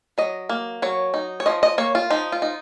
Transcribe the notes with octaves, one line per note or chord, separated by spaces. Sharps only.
F#3 D#5
A#3
F#3 C#5
D#4
C#5
F3 D#5
D#5
A#3 C#5
F4
F3 D#4
F4
D#4